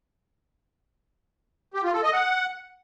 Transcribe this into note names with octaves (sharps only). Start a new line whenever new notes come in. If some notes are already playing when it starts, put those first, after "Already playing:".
G4
F4
A4
D#5
F#5